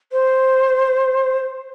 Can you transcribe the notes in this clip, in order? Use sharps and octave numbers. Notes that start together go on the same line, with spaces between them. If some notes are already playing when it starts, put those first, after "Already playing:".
C5